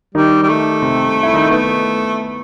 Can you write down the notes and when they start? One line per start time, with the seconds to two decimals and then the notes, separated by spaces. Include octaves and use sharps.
0.15 D#3 G3 D#4
0.43 G3
0.49 A3
0.82 C3 C4
1.23 E4
1.33 D#3 D#4
1.50 A3 B3